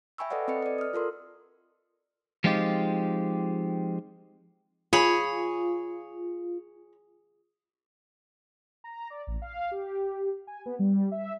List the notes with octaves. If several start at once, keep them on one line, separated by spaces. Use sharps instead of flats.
E5 G5 G#5 B5 C#6 E6
A4 B4 D5 D#5 F#5
C4 A4 B4 D#5 C#7
B4 D5
D#6 F6
F4 A4 A#4 C6
F3 G#3 C4 D#4 F4 G4
F4 G#4 C#5 B5
A#5
D5
A1
F5
G4
G#5
B3
G3
E5